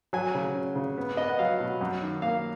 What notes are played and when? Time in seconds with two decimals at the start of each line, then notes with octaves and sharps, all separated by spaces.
0.13 F#3 G#5
0.35 C#3
0.55 C#4
0.76 C#3
0.98 B3
1.17 B3 D#5
1.30 F#5
1.39 F#3 F5
1.60 B2
1.81 F#2
2.02 D#3
2.22 A#3 F5